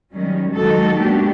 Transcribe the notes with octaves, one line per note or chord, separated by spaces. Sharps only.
D#3 F#3 G3 C#4
D#3 F#3 G#3 D#4 F#4 A4
G#3 A#3 B3 D4 F#4 G4